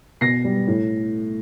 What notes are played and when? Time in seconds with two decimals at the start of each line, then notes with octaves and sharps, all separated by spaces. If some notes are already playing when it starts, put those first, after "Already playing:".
0.21 B2 A#6 C7
0.44 G3
0.67 A2